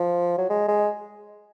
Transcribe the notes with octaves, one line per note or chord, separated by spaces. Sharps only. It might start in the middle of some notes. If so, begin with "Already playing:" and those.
Already playing: F3
F#3
G#3
G#3